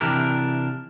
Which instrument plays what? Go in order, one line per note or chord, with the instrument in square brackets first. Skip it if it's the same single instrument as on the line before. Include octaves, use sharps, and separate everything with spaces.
[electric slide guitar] C3 E3 D4 E4 G4 A#4